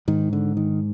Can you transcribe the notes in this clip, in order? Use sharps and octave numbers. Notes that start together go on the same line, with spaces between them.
G#2 D#3
D3
D#3